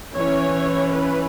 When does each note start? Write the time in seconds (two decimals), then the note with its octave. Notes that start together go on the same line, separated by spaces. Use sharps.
0.15 E3 C#4 C#5
0.91 B4